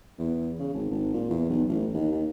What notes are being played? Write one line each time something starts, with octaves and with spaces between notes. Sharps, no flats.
E2
C#3
G#1
G#1
A#2
E2
B1
A1
D#2
D#2